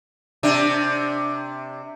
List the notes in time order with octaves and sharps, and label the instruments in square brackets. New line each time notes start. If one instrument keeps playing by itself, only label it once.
[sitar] C3 D4